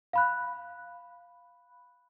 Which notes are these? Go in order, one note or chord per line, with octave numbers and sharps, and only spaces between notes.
F5 B5 F#6